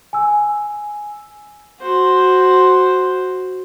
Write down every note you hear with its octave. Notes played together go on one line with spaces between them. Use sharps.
G#5 E6
F#4 C5